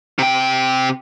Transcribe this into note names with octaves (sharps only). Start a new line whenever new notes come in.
C3 G5